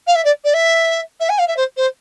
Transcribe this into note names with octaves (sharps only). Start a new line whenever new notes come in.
F5
E5
D5
D5
E5
E5
G#5
F5
E5
C5
C5